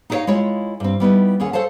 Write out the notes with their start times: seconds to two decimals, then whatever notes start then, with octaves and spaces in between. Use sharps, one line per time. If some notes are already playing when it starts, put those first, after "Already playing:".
0.10 D#4 F#4 A4 C5 C#5 F5
0.27 G#3 E4 F4 C#5
0.80 G2 C4
1.00 G3 B3 D#4 E4
1.40 D#2 C#4 G#4 F#5
1.53 A4 C5 C#5 F5 A5